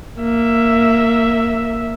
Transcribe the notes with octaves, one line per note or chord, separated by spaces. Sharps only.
A#3 E5